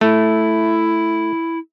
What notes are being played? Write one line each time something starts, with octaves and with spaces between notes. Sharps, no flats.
A3 E4